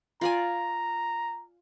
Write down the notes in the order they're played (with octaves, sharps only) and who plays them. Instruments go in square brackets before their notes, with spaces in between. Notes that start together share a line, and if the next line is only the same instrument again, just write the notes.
[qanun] F4 D5 G#5 [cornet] A#5